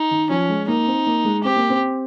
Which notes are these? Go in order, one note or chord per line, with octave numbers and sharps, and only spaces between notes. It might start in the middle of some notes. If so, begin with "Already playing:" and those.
Already playing: D#4
D#3
F3 C#4
G#3
A#3 D#4
C4
A#3
G#3
C4 G4
A#3
C4